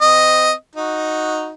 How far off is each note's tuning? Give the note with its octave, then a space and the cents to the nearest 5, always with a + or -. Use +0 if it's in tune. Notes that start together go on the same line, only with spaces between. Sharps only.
C4 -25 D#5 +0
D#4 +0 F#4 -10